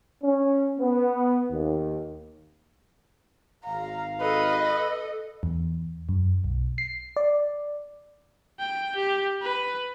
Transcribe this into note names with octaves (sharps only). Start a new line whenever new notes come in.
C#4
B3
D#2
G#1 F5 A#5
A4 B4 D#5
E2
F#2
B1
C7
D5
G5
G4
B4